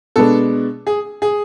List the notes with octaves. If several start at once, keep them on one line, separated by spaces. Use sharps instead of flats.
B2 G#3 B3 D4 A4
G#4
G#4